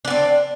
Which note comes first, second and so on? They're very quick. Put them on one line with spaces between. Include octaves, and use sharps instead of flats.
D4 B3 C4